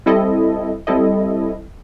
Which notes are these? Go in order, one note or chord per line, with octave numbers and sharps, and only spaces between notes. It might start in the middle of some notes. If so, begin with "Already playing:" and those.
G3 C4 E4 A4 D#5
G3 C4 E4 A4 D#5